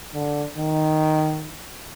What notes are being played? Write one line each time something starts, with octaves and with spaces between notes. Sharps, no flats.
D3
D#3